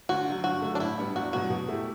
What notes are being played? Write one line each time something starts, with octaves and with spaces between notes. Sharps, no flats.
D2 F#4
D3 F#3
G2 F#4
D3 F#3 A3
D4
A2 E4
G3 B3 D4
E2 F#4
B2 F#3 B3 F#4
B2
A3 E4 G4